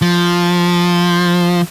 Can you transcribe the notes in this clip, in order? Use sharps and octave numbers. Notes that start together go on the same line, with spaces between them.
F3